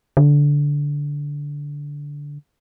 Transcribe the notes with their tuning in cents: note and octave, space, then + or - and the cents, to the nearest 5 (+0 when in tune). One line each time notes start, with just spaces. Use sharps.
D3 -15